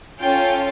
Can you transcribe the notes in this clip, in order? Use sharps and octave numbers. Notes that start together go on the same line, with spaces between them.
C#4 F4 A4 G5